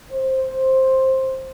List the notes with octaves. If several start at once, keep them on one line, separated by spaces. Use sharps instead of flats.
C5